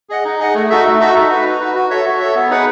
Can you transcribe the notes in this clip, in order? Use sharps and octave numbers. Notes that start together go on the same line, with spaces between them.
G#4 D#5 F#5
D#4
G#4 D#5 F#5
A3
D#4 F#4 A4 E5
A3
D#4 F#4 A4 E5
D#4
F#4 B4
D#4
F#4 B4
F#4
A4 C#5 E5
F#4
A4 C#5 E5
B3
D#4 G#4 B4 F#5